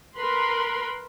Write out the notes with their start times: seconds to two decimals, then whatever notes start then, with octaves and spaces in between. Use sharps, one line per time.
0.16 A#4 B4 B5 C6